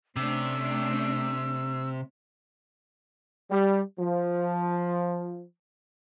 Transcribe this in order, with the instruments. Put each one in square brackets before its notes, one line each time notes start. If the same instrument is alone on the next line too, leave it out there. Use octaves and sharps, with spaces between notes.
[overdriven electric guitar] C3 [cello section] A3 C#4 D4 [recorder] E6
[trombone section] G3
F3